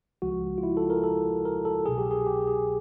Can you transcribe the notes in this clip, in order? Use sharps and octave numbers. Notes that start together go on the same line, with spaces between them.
C#2 C#3 F3 G#3 F#4
F4
E4
A4
A#4
A4
A#4
A4
C2 B2 F#3 G#4
G4
G#4
G4
G#4